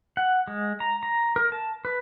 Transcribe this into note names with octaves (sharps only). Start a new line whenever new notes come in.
F#5
G#3
A#5
A#5
A#4
A5
B4